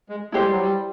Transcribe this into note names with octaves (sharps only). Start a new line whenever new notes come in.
G#3
G#3 E4 G4 C5
G3
F#3
G3